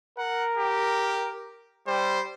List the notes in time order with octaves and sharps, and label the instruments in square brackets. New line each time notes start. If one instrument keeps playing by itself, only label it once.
[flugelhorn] A#4 [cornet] F#5
[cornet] G4
[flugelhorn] G3 [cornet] C5